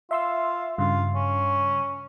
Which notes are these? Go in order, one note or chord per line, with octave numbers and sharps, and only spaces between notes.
F4 E5 C6 E6
G2 C#3 F4
C#4